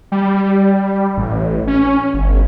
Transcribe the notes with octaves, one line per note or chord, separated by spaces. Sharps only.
G3
A1
C#4
G1